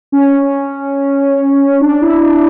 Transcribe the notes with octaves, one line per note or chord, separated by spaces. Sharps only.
C#4
D4
E4
D4